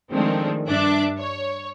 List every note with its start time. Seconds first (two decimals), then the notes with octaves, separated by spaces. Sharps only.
0.10 D#3 F3 G#3 A3 C4 D4
0.68 G2 D4 E5 D6 F#6
1.19 C#5